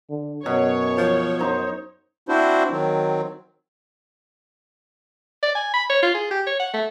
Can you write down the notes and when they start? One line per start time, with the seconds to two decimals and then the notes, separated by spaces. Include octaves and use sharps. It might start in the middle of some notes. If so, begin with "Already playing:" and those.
0.10 D3
0.46 F#2 B2 C#5
0.98 F3
1.39 F#2 D#4 C5
2.29 C4 D4 E4 F#4 C5
2.71 D#3 F#3 C4
5.43 D5
5.55 G#5
5.73 B5
5.90 C#5
6.03 F4
6.15 G#4
6.31 G4
6.46 C#5
6.60 F#5
6.73 A3